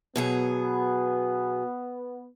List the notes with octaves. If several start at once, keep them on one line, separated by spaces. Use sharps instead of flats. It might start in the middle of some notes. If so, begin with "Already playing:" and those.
B2 F#3 B3 G#4